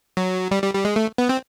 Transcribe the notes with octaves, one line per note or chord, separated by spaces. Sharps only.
F#3
G3
G3
G3
G#3
A3
B3
C4